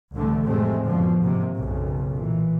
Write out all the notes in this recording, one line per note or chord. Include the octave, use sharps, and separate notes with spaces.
C2 G#2 D3 E3 A3
A1 F2 C3 G#3 A3 C4
F#2 B2 D3 F3
G#2 C3 D#3 A#3
B1 F#2 C#3
A#2 E3